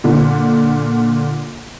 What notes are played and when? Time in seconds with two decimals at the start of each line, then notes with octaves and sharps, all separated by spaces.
0.04 A#2 D3